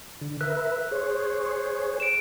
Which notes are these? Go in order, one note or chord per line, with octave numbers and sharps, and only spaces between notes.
D3
A#4 B4 E5 F#6
G#4 C5 C#5
D7 E7